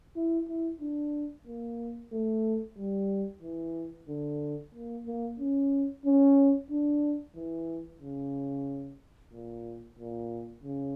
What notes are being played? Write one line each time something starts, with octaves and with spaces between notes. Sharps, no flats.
E4
E4
D4
A#3
A3
G3
E3
D3
A#3
A#3
C#4
C#4
D4
E3
C#3
A#2
A#2
C#3